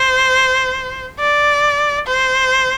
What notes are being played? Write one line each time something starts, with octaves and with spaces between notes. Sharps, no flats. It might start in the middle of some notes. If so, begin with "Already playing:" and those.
Already playing: C5
D5
C5